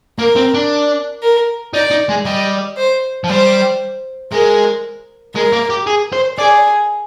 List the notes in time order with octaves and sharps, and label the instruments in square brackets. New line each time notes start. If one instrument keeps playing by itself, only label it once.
[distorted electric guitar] A#3 [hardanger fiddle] A#4
[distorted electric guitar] C4
D4
[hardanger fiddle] A#4
[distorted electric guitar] D#4 [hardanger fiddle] D5
[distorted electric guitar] D#4
G#3
[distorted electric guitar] G3 [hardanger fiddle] D#5
[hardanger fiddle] C5
[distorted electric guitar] F3
[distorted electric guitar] G3 [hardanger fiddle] C5
[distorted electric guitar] G#3 [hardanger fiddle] A#4
[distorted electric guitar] G#3 [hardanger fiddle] A#4
[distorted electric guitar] A#3
G4
G#4
C5
[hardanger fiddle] G#4 [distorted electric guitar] D5